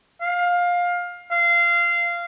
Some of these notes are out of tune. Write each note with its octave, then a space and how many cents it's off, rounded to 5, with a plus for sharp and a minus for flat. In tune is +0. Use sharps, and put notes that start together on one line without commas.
F5 +20
F5 -20